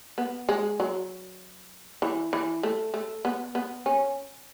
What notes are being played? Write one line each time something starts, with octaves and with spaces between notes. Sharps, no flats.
B3
G#3
F#3
E3
E3
A3
A3
B3
B3
C#4